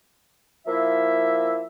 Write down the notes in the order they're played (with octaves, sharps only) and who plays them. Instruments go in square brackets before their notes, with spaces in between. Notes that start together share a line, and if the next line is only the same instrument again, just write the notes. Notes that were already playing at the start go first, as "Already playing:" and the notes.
[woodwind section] F3 A#3 E4 E5